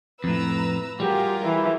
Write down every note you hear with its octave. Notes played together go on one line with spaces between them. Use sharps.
F2 A2 B4 A#5 E6
F#3 G3 F4 G4 G#4 A#4
E3